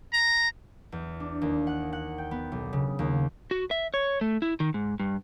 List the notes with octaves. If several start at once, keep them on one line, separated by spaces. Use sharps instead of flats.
A#5
E2
D4
D#2
F#5
F#5
G5
B3
B1
C#3
D#2
F#4
E5
C#5
A3
E4
D#3
G#2
G2